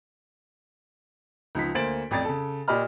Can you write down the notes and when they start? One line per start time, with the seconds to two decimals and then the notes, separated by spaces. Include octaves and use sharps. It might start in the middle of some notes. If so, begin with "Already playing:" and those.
1.55 C#2 F3 D#4 B6
1.75 D2 A#3 C5 A6 D7 F#7
2.11 A1 F2 D5 A6
2.25 C#3 A4
2.68 A#2 G4 D5 D#5 B5 F6